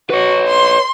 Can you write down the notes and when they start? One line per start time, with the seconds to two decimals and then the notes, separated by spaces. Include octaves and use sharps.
0.10 F#4 B4 C#5
0.47 C6